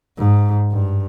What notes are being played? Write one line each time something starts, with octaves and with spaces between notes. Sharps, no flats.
G#2
G2